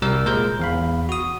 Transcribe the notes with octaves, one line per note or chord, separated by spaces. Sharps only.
C2 G3 A#4 E6
A#2 G#3 A#4 C5 G6
E2 F5 B5
F#4 D#6